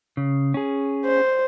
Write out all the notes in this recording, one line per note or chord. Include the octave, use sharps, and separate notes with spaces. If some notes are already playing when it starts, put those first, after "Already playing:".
C#3
C#4 G#4
C5